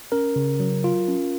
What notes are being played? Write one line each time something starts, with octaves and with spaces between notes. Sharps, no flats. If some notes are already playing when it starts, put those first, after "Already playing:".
C#4 A#4
C#3
F#3
F4
C#4